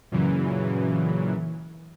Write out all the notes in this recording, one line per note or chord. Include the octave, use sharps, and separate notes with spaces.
F#2 A#2 C#3 E3 F#3